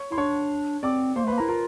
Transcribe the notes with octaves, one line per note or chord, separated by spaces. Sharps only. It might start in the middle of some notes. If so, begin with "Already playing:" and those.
Already playing: C#5 C#6
E4 C6
D4 C#5 C#6
C4 D5 D6
A#3 C5 C6
A3
B4 B5
A#3
E4 A#4 A#5
F4 A#4 A#5